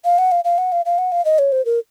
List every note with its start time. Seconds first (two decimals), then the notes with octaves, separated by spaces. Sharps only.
0.05 F5
0.18 F#5
0.32 F5
0.45 F5
0.58 F#5
0.72 F5
0.86 F5
0.98 F#5
1.12 F5
1.25 D#5
1.39 C#5
1.52 C5
1.65 A#4